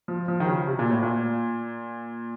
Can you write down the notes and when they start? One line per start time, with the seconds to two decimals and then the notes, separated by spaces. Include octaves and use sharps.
0.08 F3
0.28 F3
0.40 D#3
0.47 C#3
0.67 C3
0.79 A#2
0.91 A2
1.03 A#2